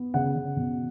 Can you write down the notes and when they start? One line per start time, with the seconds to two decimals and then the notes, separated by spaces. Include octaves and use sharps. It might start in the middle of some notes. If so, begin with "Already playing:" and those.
Already playing: B3
0.14 C#3 F#5
0.35 C#3
0.56 B2